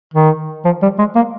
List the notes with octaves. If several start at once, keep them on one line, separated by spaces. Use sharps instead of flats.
D#3
F3
G3
G#3
A#3